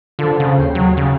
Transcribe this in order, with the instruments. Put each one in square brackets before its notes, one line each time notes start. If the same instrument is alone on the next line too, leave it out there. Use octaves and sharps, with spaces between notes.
[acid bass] D3 [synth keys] F4 A4 C5
[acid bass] C#3
[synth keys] D#2 G5 C7
[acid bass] F#3
C#3